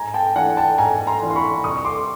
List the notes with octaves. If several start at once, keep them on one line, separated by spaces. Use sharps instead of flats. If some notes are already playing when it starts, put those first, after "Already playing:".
Already playing: G#2 G#5 A#5
G5 A5
E3 A3 D4 F4 F#5 G#5
G5 A5
G#2 G#5 A#5
A#5 C6
E3 A3 D4 F4
C6
B5 C#6
C2 C#6 D#6
C6 D6